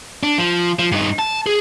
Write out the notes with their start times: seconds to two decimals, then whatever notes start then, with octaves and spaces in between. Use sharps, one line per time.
0.23 D4
0.38 F3
0.79 F3
0.92 G2 D#4
1.19 A5
1.47 G#4